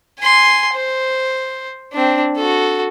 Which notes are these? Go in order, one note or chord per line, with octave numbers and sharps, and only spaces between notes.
G#5 C6
C5
C4 D4
F#4 A4